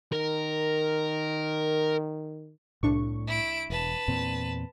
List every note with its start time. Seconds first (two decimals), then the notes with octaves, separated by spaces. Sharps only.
0.12 D#3 A#4
2.83 C2 A2 D4 C#6
3.27 E4 D7
3.70 E1 B4 A5
4.08 E2 A#2 C4